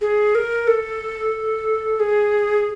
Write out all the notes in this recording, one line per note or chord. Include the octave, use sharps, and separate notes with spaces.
G#4
A#4
A4
G#4